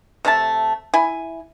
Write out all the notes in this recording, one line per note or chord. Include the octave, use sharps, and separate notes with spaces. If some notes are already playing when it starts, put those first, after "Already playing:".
C3 A3 E5 A5
E4 G#5